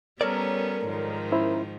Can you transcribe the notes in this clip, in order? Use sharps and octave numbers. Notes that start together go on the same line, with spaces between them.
G3 B3 C#4 A4 A#4 C#5 D5
G#2 D#3 F3
C#4 E4 C5